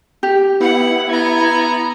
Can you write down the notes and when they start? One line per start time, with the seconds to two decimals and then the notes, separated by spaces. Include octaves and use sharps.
0.23 G4
0.60 B3 E4 F#5
1.09 B3 A#5 G#6